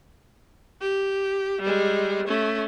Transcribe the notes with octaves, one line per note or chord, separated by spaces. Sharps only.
G4
G3 G#3
A3 C#4